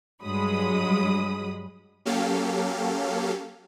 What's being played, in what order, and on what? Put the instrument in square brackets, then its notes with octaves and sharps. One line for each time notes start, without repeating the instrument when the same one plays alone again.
[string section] G2 F#3 G#3 B5 D#6
[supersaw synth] F#3 A#3 C#4 G4 A4 F5